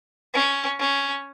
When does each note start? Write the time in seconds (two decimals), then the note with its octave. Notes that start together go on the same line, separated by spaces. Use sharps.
0.34 C#4
0.79 C#4